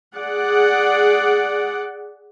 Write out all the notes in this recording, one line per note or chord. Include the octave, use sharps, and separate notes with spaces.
G#4 D5 F#5